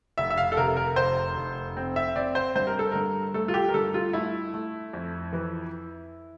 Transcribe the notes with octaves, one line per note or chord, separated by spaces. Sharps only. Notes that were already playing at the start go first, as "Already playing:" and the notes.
F1 E5
E5
F5
A4
C3 A#4
A#4
F1 C5
F1
C4
E5
C4 D5
C5
G2 C5
A#4
A4
G2 A#4
A3 A4
F4
G4
A#4
G2 A4
F4
A3 E4
A3
F2
E3